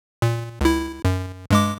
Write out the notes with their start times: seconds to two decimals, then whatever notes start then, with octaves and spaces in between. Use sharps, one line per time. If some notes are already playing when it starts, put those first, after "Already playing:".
0.22 A#2
0.61 C#2 E4
1.05 F#2
1.50 G2 G#3 D6